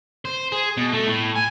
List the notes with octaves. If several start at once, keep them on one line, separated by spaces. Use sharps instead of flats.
C5
G#4
B2
A3
A2
G#5